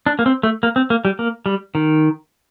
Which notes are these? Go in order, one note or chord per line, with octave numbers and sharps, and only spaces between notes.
D4
A#3
C4
A3
A#3
C4
A#3
G3
A#3
G3
D#3